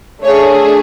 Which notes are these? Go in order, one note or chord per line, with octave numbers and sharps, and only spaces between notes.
A3 D4 G#4 C#5